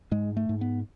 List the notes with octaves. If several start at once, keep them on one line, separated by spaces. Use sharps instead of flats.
G#2 G#3
A3
G#2
B3